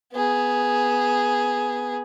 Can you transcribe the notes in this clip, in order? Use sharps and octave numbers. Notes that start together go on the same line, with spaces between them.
B3 G#4